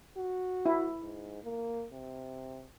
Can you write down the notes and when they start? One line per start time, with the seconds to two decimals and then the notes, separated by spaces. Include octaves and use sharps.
0.17 F#4
0.66 E4
1.02 G#2
1.44 A#3
1.93 C3